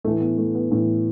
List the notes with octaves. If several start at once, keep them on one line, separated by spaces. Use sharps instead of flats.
A2 E3 A3
B3
A3
B3
A2 E3